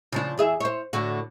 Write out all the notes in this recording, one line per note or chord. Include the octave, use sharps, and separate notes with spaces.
C#3 F3 D4
E2 G#4 E5
C5 C#5
A2 D3 F#4